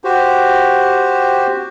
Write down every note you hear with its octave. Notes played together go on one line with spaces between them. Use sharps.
F#4 G4 C5